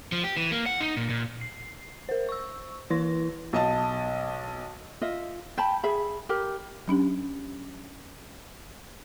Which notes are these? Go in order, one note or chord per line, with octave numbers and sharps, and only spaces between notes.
F3
G4
E3
A#3
F#5
D#4
A#2
A#2
C7
A#4 C5
C#6 E6
E3 E4 B4 C6 A#6
B1 D#5 A5
F4 D#5 E5
G5 A5 B5
G#4 E5 B5
G4 A#4
F#3 C#4 D4 G4